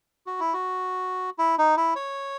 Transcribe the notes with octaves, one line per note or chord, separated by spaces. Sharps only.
F#4
E4
F#4
E4
D#4
E4
C#5